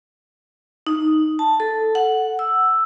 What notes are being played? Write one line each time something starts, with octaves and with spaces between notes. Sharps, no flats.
D#4
A5
A4
F#5
E6